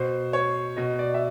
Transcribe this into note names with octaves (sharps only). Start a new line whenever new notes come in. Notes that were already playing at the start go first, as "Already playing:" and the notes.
Already playing: B2 C5
C#5
B2 D#5
D5
E5